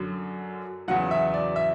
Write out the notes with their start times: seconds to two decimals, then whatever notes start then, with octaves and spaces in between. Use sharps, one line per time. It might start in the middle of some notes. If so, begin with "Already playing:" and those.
Already playing: F#2 D3 F#3
0.88 E2 C#3 F#3 F#5
1.11 E5
1.34 D5
1.56 E5